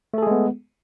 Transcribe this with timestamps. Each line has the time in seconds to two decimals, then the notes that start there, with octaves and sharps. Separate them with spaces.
0.14 A3
0.18 A4
0.22 G#4
0.27 G#3
0.31 B3